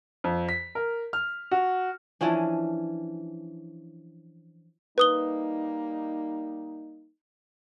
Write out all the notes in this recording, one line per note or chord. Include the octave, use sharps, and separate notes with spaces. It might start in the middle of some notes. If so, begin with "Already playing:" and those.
F2
B6
A#4
F6
F#4
E3 F3 C#4 D4
G3 A#3 D#4 B4 D#6 G7